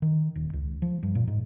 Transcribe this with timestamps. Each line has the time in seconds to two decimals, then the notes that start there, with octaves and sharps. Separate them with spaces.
0.02 D#3
0.36 D#1
0.54 C#2
0.82 F3
1.03 G2
1.15 A#2
1.27 G#2